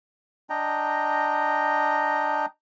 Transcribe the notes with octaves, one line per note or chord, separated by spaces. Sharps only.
D4 D#5 G5 A#5